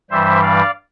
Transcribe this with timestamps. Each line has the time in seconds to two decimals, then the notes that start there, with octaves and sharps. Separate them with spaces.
0.10 G2 E3 G3 C5 E5
0.42 D5 F5